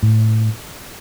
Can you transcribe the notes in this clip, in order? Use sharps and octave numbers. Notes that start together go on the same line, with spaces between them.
A2